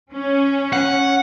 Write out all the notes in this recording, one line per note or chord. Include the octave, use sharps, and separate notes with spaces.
C#4
F#5